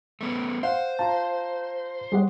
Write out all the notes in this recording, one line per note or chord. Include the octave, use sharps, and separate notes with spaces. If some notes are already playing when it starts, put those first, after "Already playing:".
A3 B3 C#4
C5 F5 F#5
F4 A5 A#5
G3 G#3 G4 C#5 F#5